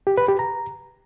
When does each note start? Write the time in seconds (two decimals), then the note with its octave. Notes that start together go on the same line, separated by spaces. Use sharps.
0.07 G4
0.18 B4
0.28 G4
0.39 A#5